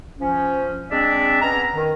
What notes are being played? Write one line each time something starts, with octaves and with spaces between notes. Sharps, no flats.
F3 C#4
G#3 C4 D4 D5 E5
B3 C#4 A#5
D#3